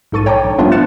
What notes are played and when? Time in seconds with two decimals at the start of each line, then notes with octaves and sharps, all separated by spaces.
0.12 B1 G#2 A4 C#6 A6 D#7
0.26 C#5 G5 A5 A#5 C#6 D6
0.45 A#1
0.58 F3 G3 A3 B3 D4 F4
0.72 F6 F#6 A6 C#7 E7